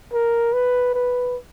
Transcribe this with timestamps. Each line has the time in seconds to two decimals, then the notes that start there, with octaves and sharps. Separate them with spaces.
0.14 A#4
0.53 B4
0.95 B4